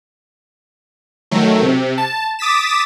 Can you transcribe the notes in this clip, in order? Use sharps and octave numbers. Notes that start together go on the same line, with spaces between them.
D#3 F#3 A3
C3
A5
D6 D#6 A6 B6 E7